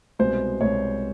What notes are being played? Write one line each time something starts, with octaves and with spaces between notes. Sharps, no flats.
C2 B2 G#3 B3 C5
C2 B2 G#3 B3 C#5